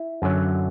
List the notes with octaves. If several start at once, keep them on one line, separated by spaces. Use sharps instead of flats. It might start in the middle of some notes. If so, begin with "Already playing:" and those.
Already playing: E4
F#2 D3 F#3